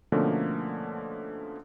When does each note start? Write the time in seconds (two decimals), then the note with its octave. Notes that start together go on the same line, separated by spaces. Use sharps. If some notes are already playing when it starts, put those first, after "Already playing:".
0.12 B2 D3 F3 A3 A#3 C#4